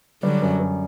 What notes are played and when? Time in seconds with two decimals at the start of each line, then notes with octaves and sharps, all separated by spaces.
0.23 D3 F#3 G3
0.42 F#2
0.60 F#2